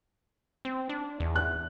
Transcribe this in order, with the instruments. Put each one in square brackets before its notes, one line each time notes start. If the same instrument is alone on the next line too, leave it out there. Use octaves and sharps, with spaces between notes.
[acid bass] C4
D4
E2
[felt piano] F#6